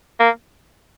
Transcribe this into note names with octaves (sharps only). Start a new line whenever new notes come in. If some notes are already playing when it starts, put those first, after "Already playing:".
A#3